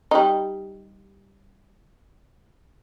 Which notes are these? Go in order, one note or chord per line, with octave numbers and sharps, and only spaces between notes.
G3 D#4